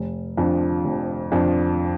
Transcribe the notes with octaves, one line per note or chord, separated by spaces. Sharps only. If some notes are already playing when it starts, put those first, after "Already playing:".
Already playing: F1
F2 F3 D4
F1
F2 F3 D4